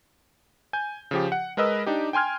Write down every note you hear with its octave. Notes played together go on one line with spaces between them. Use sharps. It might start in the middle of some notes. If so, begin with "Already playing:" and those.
G#5 G6
C#3 F3 G4
F#5
G#3 A#4 B4 D#5 E6
D4 D#4 G4
G5 G#5 C6 F6 G#6